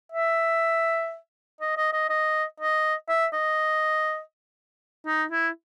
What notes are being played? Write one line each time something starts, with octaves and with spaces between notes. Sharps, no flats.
E5
D#5
D#5
D#5
D#5
D#5
E5
D#5
D#4
E4